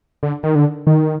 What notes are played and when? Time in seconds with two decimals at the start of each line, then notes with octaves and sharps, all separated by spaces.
0.23 D3
0.43 D#3
0.55 D3
0.87 D#3